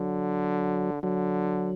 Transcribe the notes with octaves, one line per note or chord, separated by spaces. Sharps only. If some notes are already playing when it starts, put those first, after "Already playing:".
Already playing: D3 F#3
D3 F#3